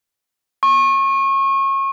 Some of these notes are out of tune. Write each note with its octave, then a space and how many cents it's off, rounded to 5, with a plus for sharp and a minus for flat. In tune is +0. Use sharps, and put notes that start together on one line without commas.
C#6 -30